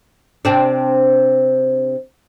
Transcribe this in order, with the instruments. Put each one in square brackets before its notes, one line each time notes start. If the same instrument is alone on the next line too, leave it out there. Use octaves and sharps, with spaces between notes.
[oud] C3 C4 D4